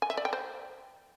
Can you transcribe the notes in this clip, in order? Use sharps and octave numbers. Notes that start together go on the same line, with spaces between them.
G#5
E5
D5
G5
C5